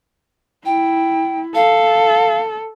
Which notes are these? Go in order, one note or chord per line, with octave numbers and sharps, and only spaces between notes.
E4 G5
A4 F5